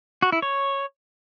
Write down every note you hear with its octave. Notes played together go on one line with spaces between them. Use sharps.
F#4
E4
C#5